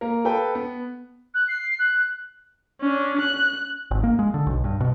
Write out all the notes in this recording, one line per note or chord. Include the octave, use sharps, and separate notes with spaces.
A#3 A#4
A4 B4 G5
B3
F#6
C7
F#6
C#4 D4
F#6
G#1
A#3
G#3
D3
B1
G2
B2